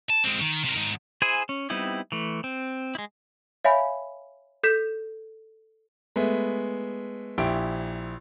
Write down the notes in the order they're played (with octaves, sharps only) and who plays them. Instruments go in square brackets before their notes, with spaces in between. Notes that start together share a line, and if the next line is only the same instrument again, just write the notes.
[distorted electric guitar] A5
G#3 C4
D#3
C3 A#4
G#2 D#3
[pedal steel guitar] E4 G#4 C5 G#5
C#4
G3 B3 C4 D#4 E4
E3 A3
C4
G#3 E4
[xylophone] C#5 E5 F5 G#5 B5
A4 G6 B6 E7
[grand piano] G#3 A3 B3
A#1 E4 G4 D7